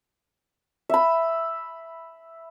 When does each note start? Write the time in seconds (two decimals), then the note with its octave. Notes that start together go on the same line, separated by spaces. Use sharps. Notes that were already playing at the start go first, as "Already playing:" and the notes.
0.89 E5 B5